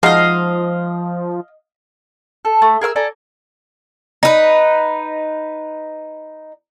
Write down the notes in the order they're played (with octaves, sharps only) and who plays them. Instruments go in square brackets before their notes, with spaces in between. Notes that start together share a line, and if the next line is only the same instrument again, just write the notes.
[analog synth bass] F3 [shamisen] G#3 D#4 F#4 [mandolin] D#5 F5
[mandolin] A4
A3
G#4 A#4 F#5 E6
A4 D5 G#5 A#5
[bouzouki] D#4 B4